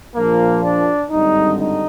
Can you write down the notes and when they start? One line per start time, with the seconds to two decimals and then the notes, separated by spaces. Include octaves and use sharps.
0.15 A#1 A#2 F3 A#3
0.63 D4
1.10 G#1 G2 D3 G3 D#4
1.58 D#4